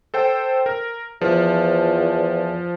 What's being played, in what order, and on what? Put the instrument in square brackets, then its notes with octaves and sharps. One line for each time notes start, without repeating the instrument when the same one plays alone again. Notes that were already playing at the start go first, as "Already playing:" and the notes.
[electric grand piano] A4 C5 G5
A#4
[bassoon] E2 [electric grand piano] F3